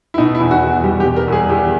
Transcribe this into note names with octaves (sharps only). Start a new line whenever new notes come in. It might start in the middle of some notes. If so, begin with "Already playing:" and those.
E4
B2 D#4
E4
E2
F#4
E2
F#4
G3 G4
G4
B2
A#4
E2 G#4
E2 G4